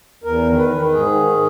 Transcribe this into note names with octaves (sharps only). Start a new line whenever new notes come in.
E2 A#4
D#3
B4
D#3
G#2 G#4
D#3